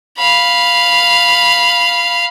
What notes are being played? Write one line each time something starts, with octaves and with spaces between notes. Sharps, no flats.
F5 B5